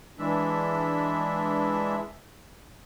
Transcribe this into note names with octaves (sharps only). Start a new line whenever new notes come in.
E3 G#3 D4 E5